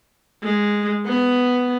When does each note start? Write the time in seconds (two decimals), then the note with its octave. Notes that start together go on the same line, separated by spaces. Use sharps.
0.43 G#3
1.06 B3